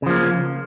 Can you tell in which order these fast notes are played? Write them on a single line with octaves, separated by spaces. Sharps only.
C#3 F3 A#3